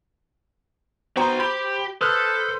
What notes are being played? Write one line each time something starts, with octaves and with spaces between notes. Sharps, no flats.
B3 F#4 C5 G5 A#5 C6
G4 B5
A4 B4 C5 D#6 F6 F#6